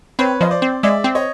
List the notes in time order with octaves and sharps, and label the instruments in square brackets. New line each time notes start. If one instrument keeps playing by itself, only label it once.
[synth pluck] C4 [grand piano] B4 C#5
[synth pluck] F3 [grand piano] D#5
[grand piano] C5 D5
[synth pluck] C4
[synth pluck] G#3 [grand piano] D5 E5
[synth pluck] C4
[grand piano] C#5 D#5